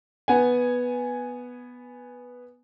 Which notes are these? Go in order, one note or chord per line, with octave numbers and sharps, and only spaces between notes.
B3 F#5 G#5